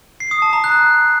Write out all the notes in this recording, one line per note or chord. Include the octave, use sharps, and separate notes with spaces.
C7
D#6
A5
A#5
F#6